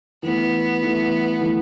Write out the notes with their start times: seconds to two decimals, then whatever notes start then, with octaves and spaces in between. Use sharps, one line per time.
0.23 E3 A3 B3 E4
0.82 E3 A3 E4
1.41 E3 A3 E4